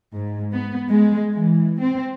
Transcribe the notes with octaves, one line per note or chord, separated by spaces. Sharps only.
G#2
B3
G#3
E3
C4